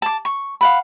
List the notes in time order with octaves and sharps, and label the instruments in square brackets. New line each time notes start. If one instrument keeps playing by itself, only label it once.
[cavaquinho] A5 D6
C#6
F5 F#5 B5